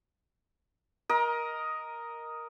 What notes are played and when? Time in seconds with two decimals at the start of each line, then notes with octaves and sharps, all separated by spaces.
1.09 A#4 D#5